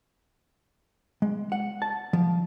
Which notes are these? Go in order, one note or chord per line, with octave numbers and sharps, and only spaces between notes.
G#3
F#5
A5
F3